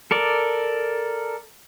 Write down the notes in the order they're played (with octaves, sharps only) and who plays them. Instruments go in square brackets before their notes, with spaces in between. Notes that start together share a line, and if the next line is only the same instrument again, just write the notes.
[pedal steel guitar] A4 A#4 D5